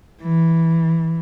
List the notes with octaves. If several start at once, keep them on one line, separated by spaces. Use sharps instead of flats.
E3